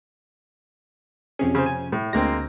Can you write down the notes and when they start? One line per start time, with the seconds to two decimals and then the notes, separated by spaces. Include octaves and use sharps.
1.39 F2 C3 C#4 G#4
1.55 C#3 C5
1.66 G#5
1.92 A2
2.13 D2 G#3 A#3 C4 A#6